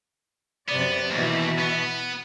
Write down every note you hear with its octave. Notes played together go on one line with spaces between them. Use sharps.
F#2 C3 B3 D5
D#2 B2 E3 E5
B3